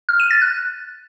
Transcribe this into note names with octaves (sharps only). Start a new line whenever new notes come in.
F6
D#7
A6
F#6